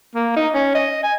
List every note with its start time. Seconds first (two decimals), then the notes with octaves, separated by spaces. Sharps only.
0.15 A#3
0.37 D#4
0.54 C#4
0.75 D#5
1.03 G#5